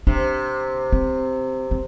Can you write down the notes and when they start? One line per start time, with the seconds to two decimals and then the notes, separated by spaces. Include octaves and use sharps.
0.07 C3 D4
0.92 C4
1.71 C4